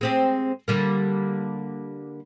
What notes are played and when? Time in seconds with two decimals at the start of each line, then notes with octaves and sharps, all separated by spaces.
0.01 G#3 C4 G4
0.68 D3 G3 A#3